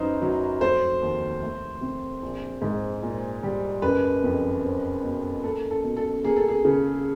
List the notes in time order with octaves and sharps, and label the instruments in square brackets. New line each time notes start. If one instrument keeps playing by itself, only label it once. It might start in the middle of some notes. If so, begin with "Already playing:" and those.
Already playing: [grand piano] F#2 D#4 [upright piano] B4 C5
[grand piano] F#3
[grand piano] F1 [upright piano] C5
[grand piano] D#2
A3
C3
A#1
G#2
A#2
G3
[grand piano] F#1 [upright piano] B4
[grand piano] F2
C4
B2
[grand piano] A#3 [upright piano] A4
[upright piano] A4
[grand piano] B2
[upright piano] A4
[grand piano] A#3 [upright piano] G#4
[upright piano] A4
G#4
[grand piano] C#3